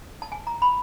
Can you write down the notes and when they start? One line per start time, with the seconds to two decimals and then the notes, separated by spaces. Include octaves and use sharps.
0.22 A5
0.32 G#5
0.47 A#5
0.62 B5